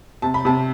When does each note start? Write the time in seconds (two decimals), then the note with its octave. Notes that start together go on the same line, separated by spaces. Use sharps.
0.22 C3 A5
0.34 B5
0.45 C3 A5